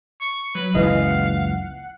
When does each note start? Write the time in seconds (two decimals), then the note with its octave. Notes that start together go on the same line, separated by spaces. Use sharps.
0.21 C#6
0.55 F#3 B4
0.75 F#1 C#2 E3 D#5 F5
1.04 F#5